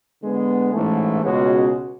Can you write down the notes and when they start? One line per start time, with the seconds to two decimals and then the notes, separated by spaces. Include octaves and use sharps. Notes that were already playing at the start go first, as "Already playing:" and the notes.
0.23 D3 G#3 B3
0.72 A1 G#2 E3 A3
1.23 C#2 B2 G#3 C#4 F#4